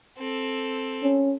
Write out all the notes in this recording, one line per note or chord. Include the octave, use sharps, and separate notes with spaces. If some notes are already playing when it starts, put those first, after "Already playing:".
C4 A4
C#4